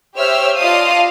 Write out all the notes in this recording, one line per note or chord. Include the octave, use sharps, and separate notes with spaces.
G4 C5 C#5 E5 E6 F6
F4 D5 D#5 F5 A5 D#6